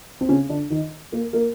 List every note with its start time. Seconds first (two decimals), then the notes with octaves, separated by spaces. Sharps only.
0.21 C4
0.29 C#3 C#4
0.49 D3 D4
0.70 D#3 D#4
1.12 A#3 A#4
1.33 A#3 A#4